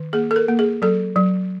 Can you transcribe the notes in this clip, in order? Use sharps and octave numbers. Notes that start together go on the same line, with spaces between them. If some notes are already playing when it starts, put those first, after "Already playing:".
Already playing: D#3
A#3 G#4
A4
A#4
A#3
G#4
F#3 A4
F#3